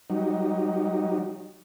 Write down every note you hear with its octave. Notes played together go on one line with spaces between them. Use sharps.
F#3 G3 D#4